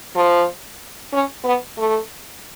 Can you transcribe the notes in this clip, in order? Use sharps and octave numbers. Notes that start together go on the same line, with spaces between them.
F3
C#4
B3
A3